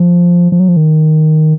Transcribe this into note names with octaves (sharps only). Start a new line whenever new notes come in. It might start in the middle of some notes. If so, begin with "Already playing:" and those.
Already playing: F3
F3
F#3
F3
D#3